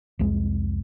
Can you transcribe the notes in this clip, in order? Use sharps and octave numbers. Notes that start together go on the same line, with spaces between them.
C2 F2 G#3